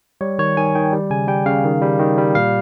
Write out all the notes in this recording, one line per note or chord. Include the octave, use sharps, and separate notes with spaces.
G3 C#5
D#3 C#5
D#3 G#5
D#3 G5
G3
C#3 G#5
G3 G5
C#3 F5
D#3
G3
D#3
G3
A#2 F5